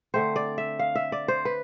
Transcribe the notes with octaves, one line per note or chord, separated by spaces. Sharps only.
D3 A3 C4 C5
D5
E5
F5
E5
D5
C5
B4